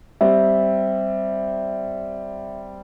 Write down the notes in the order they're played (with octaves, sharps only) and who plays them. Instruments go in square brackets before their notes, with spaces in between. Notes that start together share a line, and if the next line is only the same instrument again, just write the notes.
[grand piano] G3 C4 [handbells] E5